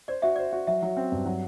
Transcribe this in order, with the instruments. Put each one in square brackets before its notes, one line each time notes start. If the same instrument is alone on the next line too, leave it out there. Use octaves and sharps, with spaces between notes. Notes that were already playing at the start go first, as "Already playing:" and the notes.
[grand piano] C5 [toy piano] D5
[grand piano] F#4 [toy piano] E5
[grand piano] C5 [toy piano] D5
[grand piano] F#4
[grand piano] F#3 [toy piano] E5
[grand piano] F#3
C4
G2
F#3